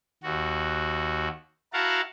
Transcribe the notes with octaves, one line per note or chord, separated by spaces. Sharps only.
D#2 F#4
E4 F#4 A#4 F5 F#5 A5